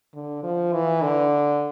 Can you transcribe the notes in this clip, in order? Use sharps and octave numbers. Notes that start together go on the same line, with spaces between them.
D3
F3
E3
D3